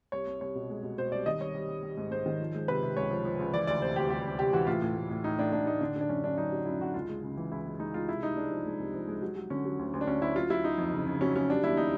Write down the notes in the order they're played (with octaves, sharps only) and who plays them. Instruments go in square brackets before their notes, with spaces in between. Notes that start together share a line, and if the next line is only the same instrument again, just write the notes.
[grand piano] C2 C#5
C2
C2 C#5
B2
G#3
B2
B2 C5
C2 D5
D#3 D#5
G3 C#5
G3
G3
G3
G#2
G#2 C5
D#3
F3
G#3
C3 B4
C3
C#2 C#5
F3
F3
C#2
E3 D5
D2 D5
C3 C5
D2 G4
G3 G4
C3
C3 G4
E3 F#4
A2 F4
A2
A2
A2
A2 D#4
A2 D4
A2 D4
A2 D#4
D3 D4
D3
D4
F#2 C#4
F#2 D4
F#2 D#4
F#3
F#2 E4
D3 F#4
C#2 F4
G#3
C#3
E3
C#2 E4
G#3
G#3 D#4
G#3 F4
C3 E4
C2 D#4
G#3 D4
F3
G#3
C2
F3
G#3
F#3
F#3
D3 C#4
F#3
D2
D2
D4
D2 C#4
D2 E4
F#3 F4
F#3 E4
F#3 D#4
F2
C#3
C#3
F#3 C#4
F#3 C#4
G3 D4
D#2 E4
G3 D#4